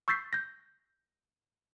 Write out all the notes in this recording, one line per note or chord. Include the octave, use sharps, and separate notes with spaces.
C#6 E6 G6 A6 B6 C7
G6 A#6